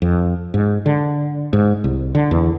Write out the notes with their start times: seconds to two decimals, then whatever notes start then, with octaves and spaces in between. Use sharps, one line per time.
0.02 F2
0.54 G#2
0.86 D3
1.53 G#2
1.84 C2
2.15 D3
2.31 E2